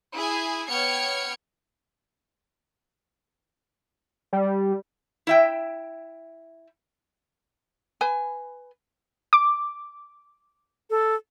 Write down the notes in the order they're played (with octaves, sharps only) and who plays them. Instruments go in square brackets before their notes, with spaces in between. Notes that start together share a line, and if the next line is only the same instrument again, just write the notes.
[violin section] E4 G#4 G#5
B3 C#5 G5 F6 G#6 C#7
[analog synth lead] G3
[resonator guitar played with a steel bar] E4 E5 G5
[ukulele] B4 G#5
[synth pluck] D6
[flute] A4